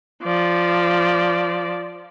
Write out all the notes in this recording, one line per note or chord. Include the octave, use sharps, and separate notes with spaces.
F3 D5